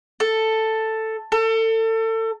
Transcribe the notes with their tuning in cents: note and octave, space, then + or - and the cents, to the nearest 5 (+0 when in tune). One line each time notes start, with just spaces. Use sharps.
A4 +5
A4 +30